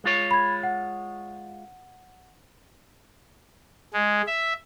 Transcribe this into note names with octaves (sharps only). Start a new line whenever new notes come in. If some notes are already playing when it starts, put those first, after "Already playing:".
G#3 F4 C#5
B5 G#6
F#5
G#3
E5